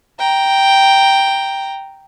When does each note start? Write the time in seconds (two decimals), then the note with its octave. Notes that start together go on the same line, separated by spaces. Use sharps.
0.19 G5 A#5